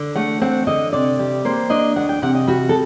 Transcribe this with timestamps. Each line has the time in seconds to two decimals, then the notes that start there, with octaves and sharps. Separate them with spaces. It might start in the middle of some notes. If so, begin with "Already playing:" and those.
Already playing: D3
0.15 A3 F#5
0.41 C4 F#5
0.67 D3 D#5
0.93 C3 D5
1.19 G3
1.45 A#3 C5
1.70 D4 D#5
1.96 D2 F#5
2.09 G5
2.22 C3 F#5
2.35 D#5
2.47 G3 F#4
2.69 A4